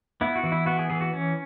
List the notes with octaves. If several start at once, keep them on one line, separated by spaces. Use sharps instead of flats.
B3 E4
F#4
E3
E4
B3 F#4
G#4
E3 G#4
F#4
C#4